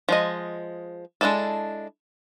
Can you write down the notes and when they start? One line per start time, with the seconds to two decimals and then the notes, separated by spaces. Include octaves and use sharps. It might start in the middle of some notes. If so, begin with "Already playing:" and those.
0.09 F3 G#3 D#5
1.21 G#3 A#3 D4 E4 A4